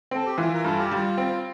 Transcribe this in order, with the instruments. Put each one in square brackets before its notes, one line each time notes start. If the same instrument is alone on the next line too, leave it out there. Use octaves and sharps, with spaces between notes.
[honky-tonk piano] C4 [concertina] A4
[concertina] G4
[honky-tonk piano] E3 [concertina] F4
[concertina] A#4
[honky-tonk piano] G2 [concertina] A4
[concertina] G4
[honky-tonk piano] G3 [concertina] F4
[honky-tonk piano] C4